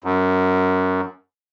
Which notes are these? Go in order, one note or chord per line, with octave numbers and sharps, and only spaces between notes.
F#2